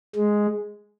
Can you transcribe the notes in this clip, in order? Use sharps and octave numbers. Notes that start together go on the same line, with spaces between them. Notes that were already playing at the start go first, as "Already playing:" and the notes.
G#3